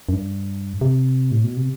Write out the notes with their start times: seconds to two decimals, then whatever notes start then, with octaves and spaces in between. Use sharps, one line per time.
0.09 F#2
0.13 G2
0.81 C3
1.32 A2
1.44 B2
1.57 C3